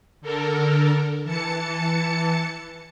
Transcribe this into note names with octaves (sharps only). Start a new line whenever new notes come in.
D3 A4 A#4
E3 A5 C#7